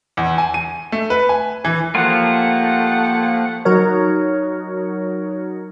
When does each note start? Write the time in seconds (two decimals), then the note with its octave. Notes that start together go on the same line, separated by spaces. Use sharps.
0.17 E2
0.38 G#5
0.54 D#7
0.92 A3
1.10 B4
1.29 G#5
1.64 E3
1.95 F3 A3 A#3 F4 G4 F#5
3.65 F#3 D#4 F#4 A#4 C#5